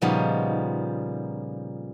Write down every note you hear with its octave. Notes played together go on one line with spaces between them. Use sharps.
A#2 C#3 F3 G3 B3 D#4